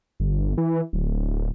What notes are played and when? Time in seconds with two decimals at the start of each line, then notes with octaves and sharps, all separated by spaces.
0.20 G1
0.58 E3
0.93 D1